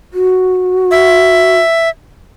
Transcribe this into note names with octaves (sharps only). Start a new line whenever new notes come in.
F#4
E5